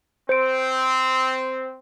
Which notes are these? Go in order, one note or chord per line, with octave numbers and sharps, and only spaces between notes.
C4 C5 D7